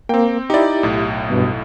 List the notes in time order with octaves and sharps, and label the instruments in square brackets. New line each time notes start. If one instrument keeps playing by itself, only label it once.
[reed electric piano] A#3 [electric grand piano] C4 G5
[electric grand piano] D#4 D5 [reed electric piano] E4 G4
[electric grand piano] B1 A2
[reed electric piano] G2 B2